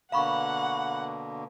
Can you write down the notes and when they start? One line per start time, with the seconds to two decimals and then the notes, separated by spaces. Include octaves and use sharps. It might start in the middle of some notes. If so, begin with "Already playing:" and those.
0.12 B2 D3 A#3 F5 F#5 B5 C#6